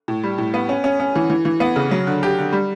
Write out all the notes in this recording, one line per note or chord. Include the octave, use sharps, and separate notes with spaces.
A2
G3
A2
B3
C#4
C#4
C#4
E3
E3
E3
B3
C#3
F#3
D3
G4
D3
G3